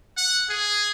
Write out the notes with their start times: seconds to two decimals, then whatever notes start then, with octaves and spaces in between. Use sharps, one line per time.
0.17 F#5
0.50 G#4